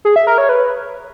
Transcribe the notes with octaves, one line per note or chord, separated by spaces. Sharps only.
G#4
E5
A#4
C#5
B4